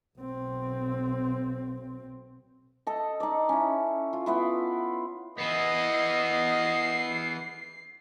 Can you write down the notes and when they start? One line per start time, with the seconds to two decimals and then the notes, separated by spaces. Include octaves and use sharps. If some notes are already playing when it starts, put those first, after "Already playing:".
0.17 B1 C4
2.87 A4 D#5
3.20 D#4 D5
3.49 C#4 E4
4.13 F4
4.26 B3 E4 F4
5.38 E3 B3 D#5 C7